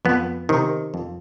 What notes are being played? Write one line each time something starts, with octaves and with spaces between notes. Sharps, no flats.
F2 B3
C3 D#3
F2